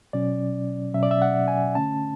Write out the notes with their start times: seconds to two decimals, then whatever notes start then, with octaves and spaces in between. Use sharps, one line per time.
0.13 B2 F#3 C#4 D5
0.94 B2 F#3 C#4 E5
1.03 D5
1.11 E5
1.22 F#5
1.48 G#5
1.75 D3 A3 C#4 A5